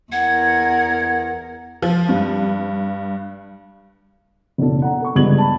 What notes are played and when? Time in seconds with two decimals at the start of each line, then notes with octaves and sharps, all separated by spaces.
0.12 E2 A#4 F#5 G#6
1.82 F3
2.09 G2
4.58 F#1 B2 D4 A4
4.82 F#5 A#5
5.02 A4 C#6
5.15 G1 C#2 G2 B3 G#6 F#7
5.38 A5 B5